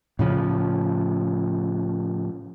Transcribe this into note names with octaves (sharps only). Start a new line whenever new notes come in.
A2 C#3 F3